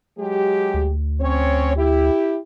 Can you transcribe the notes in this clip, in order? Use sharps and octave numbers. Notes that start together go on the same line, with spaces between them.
F#3 G#3 G4
D2
C4 C#4 C#5
E4 G4